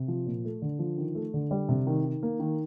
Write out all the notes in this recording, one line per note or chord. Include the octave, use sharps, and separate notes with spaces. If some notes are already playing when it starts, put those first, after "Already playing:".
Already playing: C3
F3
A#2
A3
D3
F3
D#3
A3
D3
G3
C3
D#3
D#3
A#3
D#3